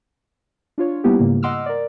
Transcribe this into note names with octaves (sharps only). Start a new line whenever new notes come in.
D4 F4 C#5
G3 A#3 B3 C#4 E4 G4
G#2 C#3 A#3
D#5 F#5 C6 D6 E6 F6
A#4 D5